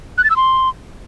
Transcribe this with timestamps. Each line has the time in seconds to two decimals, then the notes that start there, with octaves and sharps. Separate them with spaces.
0.18 F#6
0.24 A6
0.30 E6
0.36 C6